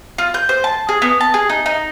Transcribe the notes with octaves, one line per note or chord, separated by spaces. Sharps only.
F4
G6
C5
A5
G#4
B3
A5
G#4
D#4
D#4